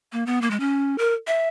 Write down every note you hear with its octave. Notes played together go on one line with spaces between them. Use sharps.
A#3
B3
A#3
G#3
C#4
A#4
E5